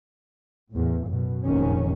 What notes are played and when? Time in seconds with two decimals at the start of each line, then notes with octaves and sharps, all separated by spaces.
0.71 E2 A2
1.07 F#2 B2
1.45 F1 A#1 D#3 C#4